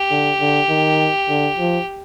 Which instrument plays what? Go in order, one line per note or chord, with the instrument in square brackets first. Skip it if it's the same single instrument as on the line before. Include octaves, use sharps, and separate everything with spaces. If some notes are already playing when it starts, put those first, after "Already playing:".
Already playing: [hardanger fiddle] G4
[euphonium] D3
D3
D#3
D3
F3